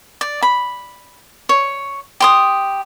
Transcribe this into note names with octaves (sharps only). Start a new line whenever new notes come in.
D5
B5
C#5
G4 C6 D#6